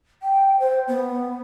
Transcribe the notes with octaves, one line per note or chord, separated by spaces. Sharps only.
G5
C5
B3